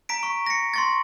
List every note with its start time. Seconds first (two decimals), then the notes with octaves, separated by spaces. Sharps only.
0.09 A#5 B6 D7
0.23 C#6
0.46 A#6 C#7
0.74 C6 C#6 A6